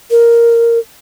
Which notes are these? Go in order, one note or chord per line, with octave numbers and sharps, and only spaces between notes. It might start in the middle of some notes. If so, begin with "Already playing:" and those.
A#4